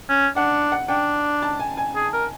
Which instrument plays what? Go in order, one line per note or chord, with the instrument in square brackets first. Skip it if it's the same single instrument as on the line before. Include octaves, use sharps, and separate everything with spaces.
[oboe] C#4
[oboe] D4 [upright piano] F#5
[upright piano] F#5
[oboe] D4 [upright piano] G5
[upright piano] A5
G#5
G#5
[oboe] G#4
A#4